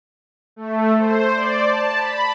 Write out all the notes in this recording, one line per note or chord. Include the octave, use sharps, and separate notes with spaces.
A3
C5
D5
A5
B5